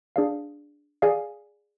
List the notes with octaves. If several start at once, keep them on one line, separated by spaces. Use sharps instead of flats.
D4 G#4 D5 F5
G#4 D5 F5 G#5